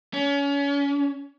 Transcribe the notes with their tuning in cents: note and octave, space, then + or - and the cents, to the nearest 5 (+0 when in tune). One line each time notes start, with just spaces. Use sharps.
C#4 +30